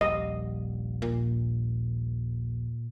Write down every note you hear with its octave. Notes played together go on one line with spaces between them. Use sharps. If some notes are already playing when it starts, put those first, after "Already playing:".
D#1 A#1 G3 D#5
A#2